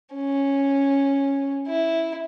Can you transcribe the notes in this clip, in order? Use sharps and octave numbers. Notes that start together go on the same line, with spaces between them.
C#4
E4